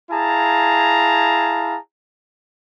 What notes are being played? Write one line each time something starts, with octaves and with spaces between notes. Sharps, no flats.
E4 G#4 F5 A5 A#5